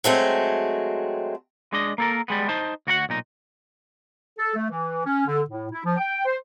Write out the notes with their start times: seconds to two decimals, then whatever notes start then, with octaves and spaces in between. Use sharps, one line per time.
0.04 F#3 G#3 A3 C4
1.73 G#3 D4 D#5
1.98 A#3 A4 A#4
2.28 G3 G#3 B3
2.49 D#4 C5 A5
2.87 D2 F#4 A#4 F#5
3.09 B1 A#2 D#4
4.38 A4
4.55 A3
4.69 E3
5.05 C#4
5.27 D3
5.48 A2
5.71 E4
5.84 F3
5.97 G5
6.25 C5